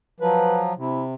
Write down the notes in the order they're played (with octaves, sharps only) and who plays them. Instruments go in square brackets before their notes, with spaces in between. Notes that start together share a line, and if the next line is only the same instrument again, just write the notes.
[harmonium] F3 F#3 [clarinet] B4
[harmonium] C3 [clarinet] E4